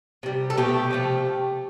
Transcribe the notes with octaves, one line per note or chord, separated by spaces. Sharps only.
C3 G3
A4
B2 A3 G4
C3 F3 A3